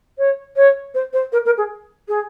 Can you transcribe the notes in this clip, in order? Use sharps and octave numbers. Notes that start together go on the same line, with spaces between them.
C#5
C#5
C5
C5
A#4
A#4
G#4
G#4